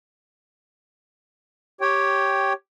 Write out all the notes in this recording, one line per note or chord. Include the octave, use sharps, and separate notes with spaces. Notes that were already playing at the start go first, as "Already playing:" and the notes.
G4 C#5 G5